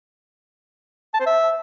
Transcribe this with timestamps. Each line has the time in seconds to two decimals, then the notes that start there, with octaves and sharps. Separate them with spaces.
1.14 A5
1.20 C5
1.26 E5